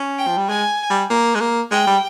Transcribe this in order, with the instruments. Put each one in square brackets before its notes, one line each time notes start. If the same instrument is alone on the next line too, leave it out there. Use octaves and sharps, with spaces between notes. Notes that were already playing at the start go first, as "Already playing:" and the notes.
Already playing: [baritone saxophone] C#4
[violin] G5
[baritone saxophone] F3
G3
[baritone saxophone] G#3 [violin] G#5
[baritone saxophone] G3
A#3
G#3
A#3
[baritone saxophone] G#3 [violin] G5
[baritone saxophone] G3